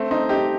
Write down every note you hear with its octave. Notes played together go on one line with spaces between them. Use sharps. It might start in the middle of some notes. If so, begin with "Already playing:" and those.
Already playing: A3 C4
C4 D#4
D#4 G4